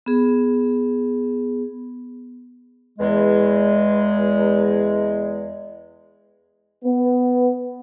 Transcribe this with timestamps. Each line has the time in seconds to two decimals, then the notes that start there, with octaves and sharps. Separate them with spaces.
0.06 B3 G#4
2.99 E2 G#3
6.85 B3